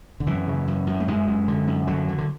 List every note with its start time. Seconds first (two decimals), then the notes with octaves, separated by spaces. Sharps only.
0.20 D3
0.26 F#2 E3
0.47 C#3
0.67 F#2
0.87 F#2
1.00 A3
1.08 F#2 G#3
1.27 F#2
1.48 D3
1.67 F#2
1.87 D3 F#3
2.08 D3
2.18 D3